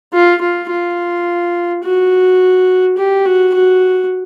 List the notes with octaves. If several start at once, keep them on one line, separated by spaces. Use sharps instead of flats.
F4
F4
F4
F#4
G4
F#4
F#4